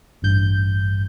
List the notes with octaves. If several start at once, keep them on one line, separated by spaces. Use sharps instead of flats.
A1 G2 G6